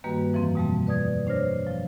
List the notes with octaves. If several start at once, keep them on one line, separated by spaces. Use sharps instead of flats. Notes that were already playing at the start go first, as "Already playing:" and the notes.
G2 D#3 G3 A#3 F#4 B4
F2 E3 F3 C4
B2 G3 A3
D#2 B4 D5 D#6 G#6
D4 C5 C#5 F6 A#6
F3